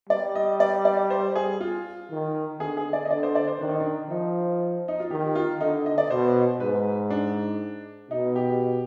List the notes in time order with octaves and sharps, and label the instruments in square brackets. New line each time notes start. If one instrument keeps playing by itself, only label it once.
[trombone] G3 [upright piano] D5
[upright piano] D#5
D5
D5
C5
G#4
F4
[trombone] D#3
[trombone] D3 [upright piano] G#4
[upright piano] G#4
D5
D#5
[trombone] D3 [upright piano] D5
[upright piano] C5
D5
C5
[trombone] D#3 [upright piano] D4
[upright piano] D#4
D4
[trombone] F3 [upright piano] D#4
[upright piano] D#4
F4
[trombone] D#3 [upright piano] G4
[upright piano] F4
[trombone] D3 [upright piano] D#4
[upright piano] D#5
D5
[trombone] B2 [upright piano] C5
[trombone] G#2 [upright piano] B4
[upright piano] D4
[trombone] B2 [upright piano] D#4
[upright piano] G4